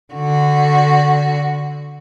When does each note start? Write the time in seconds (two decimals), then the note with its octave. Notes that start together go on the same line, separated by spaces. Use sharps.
0.13 D3 F#4